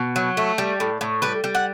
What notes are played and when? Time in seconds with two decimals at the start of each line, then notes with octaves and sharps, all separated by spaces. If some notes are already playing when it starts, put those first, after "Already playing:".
Already playing: B2
0.16 F#3
0.37 A3
0.58 G3
0.80 A2
1.01 A2
1.22 G3 B4
1.44 G3
1.55 F#5